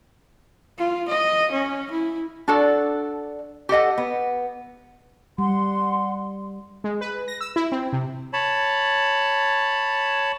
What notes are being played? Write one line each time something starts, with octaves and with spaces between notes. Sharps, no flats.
F4
D#5
C#4
E4
D4 F#4 A4 D5
G4 A4 D#5 F#5
B3
G3 F#5 C6
G#3
B4
A#6
E6
E4
C4
C3
C#5 A5 B5